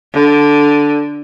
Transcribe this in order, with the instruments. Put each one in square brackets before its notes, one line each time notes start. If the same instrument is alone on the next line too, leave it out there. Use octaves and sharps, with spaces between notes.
[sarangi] D3